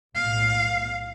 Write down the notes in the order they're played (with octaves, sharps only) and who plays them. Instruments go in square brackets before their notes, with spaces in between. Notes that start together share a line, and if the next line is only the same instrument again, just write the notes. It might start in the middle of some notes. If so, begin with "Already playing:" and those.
[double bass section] B1 A2 [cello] F5